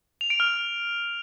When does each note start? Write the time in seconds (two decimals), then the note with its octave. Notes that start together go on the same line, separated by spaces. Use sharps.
0.21 F7
0.30 D7
0.40 F6